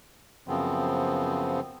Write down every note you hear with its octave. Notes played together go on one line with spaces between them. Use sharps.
F#2 C#3 F3 B3 C4